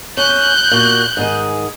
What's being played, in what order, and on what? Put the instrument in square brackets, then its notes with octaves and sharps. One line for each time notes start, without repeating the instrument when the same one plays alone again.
[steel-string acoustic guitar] C#4 [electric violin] F#6 G6
[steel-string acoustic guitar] A#2 F#4
G#2 D#3 G#4